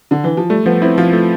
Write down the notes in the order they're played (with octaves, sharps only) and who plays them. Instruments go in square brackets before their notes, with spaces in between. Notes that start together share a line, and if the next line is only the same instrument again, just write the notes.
[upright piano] D3
E3
F3
[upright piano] G3 [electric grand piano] A3
[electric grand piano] F3 [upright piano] B3
[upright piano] C4 [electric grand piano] E4
[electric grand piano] F3 [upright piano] F4
[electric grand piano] A3